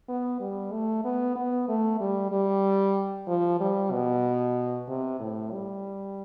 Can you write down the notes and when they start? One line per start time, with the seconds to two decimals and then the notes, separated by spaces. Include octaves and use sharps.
0.09 B3
0.41 G3
0.72 A3
1.05 B3
1.35 B3
1.68 A3
2.00 G3
2.31 G3
3.27 F3
3.60 G3
3.92 B2
4.88 C3
5.20 A2
5.52 G3